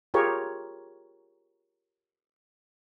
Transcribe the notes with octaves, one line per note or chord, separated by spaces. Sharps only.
F4 G4 G#4 A#4 C#5